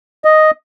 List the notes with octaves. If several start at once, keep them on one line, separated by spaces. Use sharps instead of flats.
D#5